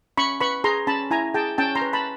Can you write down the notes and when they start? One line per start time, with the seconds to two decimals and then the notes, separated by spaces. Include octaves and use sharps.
0.17 C#4 B5 C#6
0.40 B4 B5 C#6
0.64 G#4 A#5 C6
0.87 C#4 A5 B5
1.11 E4 G#5 A#5
1.34 G#4 G5 A5
1.58 C#4 G5 A5
1.75 A#5 C6
1.82 B4
1.93 A5 B5